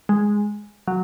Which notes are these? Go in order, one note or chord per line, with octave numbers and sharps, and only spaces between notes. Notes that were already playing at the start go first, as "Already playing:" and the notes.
G#3
F#3